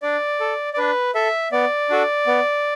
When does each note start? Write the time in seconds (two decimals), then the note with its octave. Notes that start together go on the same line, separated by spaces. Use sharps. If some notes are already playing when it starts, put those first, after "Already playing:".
0.02 D4 D5
0.40 A4
0.73 D5
0.77 D4 B4
1.15 A4 E5
1.52 B3 D5
1.90 D4 F#4 A4
2.27 B3